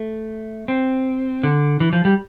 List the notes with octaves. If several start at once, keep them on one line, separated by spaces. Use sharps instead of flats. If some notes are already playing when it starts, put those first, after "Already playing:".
Already playing: A3
C4
D3
E3
F3
G3